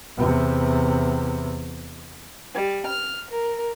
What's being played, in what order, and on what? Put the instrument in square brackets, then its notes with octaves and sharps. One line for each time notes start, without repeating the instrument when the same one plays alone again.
[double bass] E2 C3
[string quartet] G3
F6
A#4